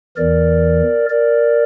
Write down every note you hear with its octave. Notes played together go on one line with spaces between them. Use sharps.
E2 E3 A#4 D5
A#4 D5